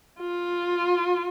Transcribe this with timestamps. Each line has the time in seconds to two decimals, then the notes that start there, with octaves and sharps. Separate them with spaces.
0.20 F4